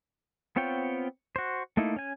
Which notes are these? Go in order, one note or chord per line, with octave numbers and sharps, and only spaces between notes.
B3 C4 F4 C#5 G5
F#4 C5
A3 A#3 D#4 E4
C#4 G#5